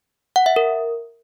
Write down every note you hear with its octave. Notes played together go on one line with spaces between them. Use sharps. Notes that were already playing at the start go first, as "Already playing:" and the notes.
F#5
E5
A#4